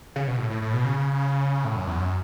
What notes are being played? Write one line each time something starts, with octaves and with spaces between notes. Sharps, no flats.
C#3
B2
A2
A2
A2
B2
C#3
A2
F#2
E2
F#2